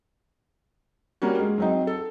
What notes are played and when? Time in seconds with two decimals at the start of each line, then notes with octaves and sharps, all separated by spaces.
1.22 G3 A#3 C#4 F#4
1.39 G#3
1.58 F#3 C4 D#4
1.87 A4